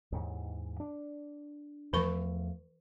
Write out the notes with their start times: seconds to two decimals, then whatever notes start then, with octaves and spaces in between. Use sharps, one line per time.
0.12 D#2 G#2 E3
0.80 D4
1.93 E2 E3 F3 A3 A#4 C#6